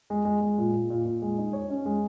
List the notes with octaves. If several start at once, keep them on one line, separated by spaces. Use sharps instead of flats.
G#3
G#3
G#3
A#2
A#2
A#2
A#2
G#3
D#4
C#5
C#4
G#3